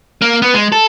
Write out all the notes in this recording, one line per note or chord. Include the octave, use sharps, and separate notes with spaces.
A#3
B3
G#3
A4